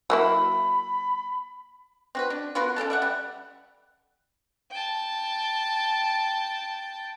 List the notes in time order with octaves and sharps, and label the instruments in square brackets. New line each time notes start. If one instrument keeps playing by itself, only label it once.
[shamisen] F#3 A#3 E4 [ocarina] B5
[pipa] C4 F#4 B4
D4
B3 F4 F#4 A#4
C#3 C#4 A4 A5
D5 E5 F#5
G3
[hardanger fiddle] G5 A5